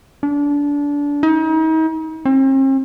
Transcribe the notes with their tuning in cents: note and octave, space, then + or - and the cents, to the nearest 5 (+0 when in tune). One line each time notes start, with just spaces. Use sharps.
D4 -25
D#4 +40
C4 +45